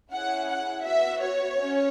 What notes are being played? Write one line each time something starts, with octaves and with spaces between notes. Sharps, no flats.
C#4 E4 G#4 F#5
F#5
B3 F#4 E5
C#5
C#4